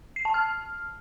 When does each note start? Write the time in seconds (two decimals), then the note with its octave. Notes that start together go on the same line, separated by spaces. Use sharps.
0.16 C7
0.25 A5
0.34 F6